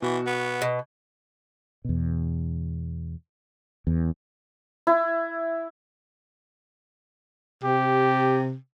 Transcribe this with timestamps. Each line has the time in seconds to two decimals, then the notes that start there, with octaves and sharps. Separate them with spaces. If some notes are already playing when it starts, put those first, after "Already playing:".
0.02 B2 E3 F#4
0.26 B3
0.62 B2
1.85 E2 B2
3.87 E2
4.87 E4
7.64 C3 G4